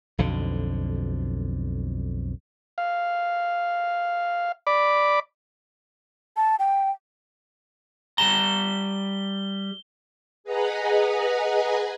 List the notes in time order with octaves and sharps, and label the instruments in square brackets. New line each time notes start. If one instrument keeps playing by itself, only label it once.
[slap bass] B1 F2 D3
[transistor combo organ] F5
D5 B5 D6
[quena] A5
G5
[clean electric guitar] G3 A5 A#5 [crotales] G7
[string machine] G#4 B4 D#5 F#5 G#5 A#5